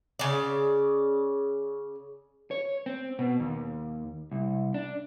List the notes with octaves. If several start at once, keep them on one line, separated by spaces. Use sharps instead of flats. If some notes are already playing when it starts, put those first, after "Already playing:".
C#3 D5
C#5
C4
B2
D#2
C2
D4